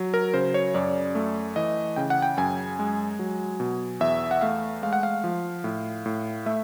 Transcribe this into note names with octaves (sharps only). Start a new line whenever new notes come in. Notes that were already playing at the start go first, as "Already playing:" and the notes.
Already playing: F#3
A#4
C#3 C5
C#5
F#2 D5
A3
E3 D#5
C#3 G5
F#5
G5
F#2 G#5
G#3
F#3
B2
E2 E5
F#5
A3 F5
G#3 F5
F#5
F5
F3
A2
A2
A3 E5